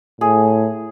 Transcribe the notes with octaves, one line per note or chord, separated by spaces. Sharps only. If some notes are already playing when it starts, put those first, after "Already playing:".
A2 G#4